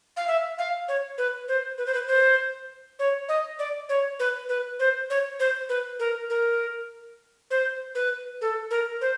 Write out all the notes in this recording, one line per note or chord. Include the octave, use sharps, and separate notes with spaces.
F5
E5
F5
C#5
B4
C5
B4
C5
B4
C5
C#5
D#5
D5
C#5
B4
B4
C5
C#5
C5
B4
A#4
A#4
C5
B4
A4
A#4
C5